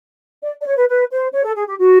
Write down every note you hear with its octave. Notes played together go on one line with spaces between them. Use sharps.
D5
D5
C#5
B4
B4
C5
C#5
A4
G#4
G4
F#4